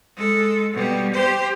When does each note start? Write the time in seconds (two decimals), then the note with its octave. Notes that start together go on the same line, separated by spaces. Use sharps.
0.16 G#3 A4
0.73 B2 G3
1.13 G4 C5